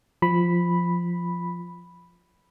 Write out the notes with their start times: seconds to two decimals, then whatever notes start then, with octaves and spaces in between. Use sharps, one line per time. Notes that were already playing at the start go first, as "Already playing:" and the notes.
0.22 F3 B5